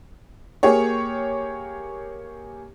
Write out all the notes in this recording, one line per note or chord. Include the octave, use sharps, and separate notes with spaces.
A#3 G4 G#4 C#5